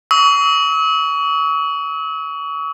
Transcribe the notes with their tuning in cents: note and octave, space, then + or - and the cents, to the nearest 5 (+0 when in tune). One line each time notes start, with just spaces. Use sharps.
C#6 +35 E6 -45